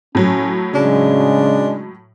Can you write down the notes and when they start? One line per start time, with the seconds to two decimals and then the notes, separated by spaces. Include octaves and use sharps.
0.15 A2 F#3 C#4
0.74 C#3 G#3 D4